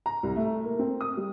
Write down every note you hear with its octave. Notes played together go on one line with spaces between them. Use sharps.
A#5
C2
A3
A#3
C4
D#6
G3